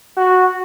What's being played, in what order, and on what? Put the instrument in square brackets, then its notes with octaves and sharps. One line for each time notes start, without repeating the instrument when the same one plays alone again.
[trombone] F#4